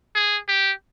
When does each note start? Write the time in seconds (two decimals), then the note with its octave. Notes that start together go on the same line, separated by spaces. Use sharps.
0.15 G#4
0.49 G4